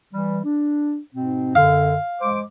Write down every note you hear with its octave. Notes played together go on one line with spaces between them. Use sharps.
E3 G3
D4
G#2 B2 C4
F#2 D3 F5
G#3 C5 D6